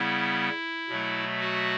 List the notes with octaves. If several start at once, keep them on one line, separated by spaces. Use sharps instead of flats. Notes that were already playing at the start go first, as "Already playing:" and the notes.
Already playing: C#3 G3 B3 E4
B2 F#3 A3
F#4